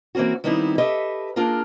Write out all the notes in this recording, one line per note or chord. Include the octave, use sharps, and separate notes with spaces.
E3 A#3 C4 C#4 F#4
D#3 G3 B3 C4 D#4 E4
G4 A4 B4 D#5 E5
A#3 D4 F4 G#4 A#4